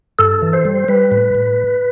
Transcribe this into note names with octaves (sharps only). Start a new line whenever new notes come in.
G2 A4
E3
C5
G3
G3 B4
A2
A2